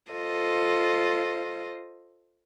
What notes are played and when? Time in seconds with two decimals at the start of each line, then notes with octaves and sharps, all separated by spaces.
0.12 F4 A4 C5 D#5